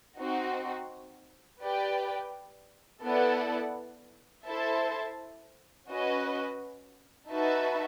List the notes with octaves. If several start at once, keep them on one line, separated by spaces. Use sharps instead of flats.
C4 D#4 F#4
G4 B4 D5 G5
B3 E4 A4 D5 F#5
E4 A4 C5 E5 A5
C#4 F#4 B4 D#5
D#4 F#4 B4 E5 A5